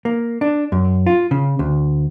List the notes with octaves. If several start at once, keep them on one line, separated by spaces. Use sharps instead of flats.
A#3
D4
F#2
F4
C#3
D2